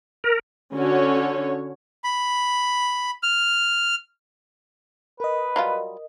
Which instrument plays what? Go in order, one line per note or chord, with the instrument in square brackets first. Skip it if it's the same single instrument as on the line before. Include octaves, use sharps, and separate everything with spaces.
[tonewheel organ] A#4
[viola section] D3 C#4 F#4 C#5
[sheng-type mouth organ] B5
F6
[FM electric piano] A#4 D#5 [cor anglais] B4
[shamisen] F#3 G3 F4